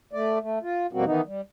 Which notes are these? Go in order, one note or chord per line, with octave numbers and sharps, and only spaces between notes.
A3 D5
A3
F4
F2 B2 G3 A#3 C4 F#4
D#3 E3 B3 D#4
G3